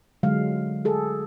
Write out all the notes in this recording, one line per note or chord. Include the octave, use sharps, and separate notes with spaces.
D3 F#3 G#3 F5
G#4 A4